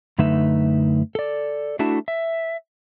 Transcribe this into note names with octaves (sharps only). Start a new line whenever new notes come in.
F#2 D3 A3 D#4 B4 E5
A4 D5
A3 D4 E4 F#4 A5
E5